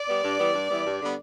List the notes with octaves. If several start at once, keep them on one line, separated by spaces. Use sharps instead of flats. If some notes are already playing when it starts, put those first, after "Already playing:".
Already playing: D5
G3 B3
G2
E3 G3 B3
G2
E3 G3 B3
G2
D3 G3 B3